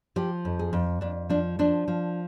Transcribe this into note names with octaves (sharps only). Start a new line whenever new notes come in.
F3 G4
F2
G#4
F2
F2 D4
F3 D4
F3 D4
F3